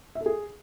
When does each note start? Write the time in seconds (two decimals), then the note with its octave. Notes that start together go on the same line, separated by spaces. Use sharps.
0.15 E5
0.21 A4
0.26 G#4